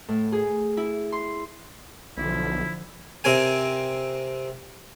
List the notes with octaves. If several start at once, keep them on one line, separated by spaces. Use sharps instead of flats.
A2
G#4
E4
C6
B1 D3 F3 E4
C3 C4 A#4 G#5